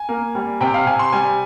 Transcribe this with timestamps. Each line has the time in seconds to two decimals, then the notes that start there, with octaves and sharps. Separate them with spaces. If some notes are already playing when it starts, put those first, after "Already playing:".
Already playing: G#5
0.09 A#3
0.35 G3
0.61 C3 G5
0.74 F5
0.87 C3 G#5
0.99 C6
1.12 G3 G#5